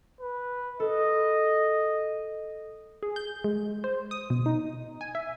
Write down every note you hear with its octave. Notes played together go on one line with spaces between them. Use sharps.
B4
A4 D#5
G#4
G6
G#3
C5
D#6
B2
D#4
G#5
E5